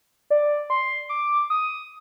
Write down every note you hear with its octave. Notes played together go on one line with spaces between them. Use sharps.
D5
C6
D6
D#6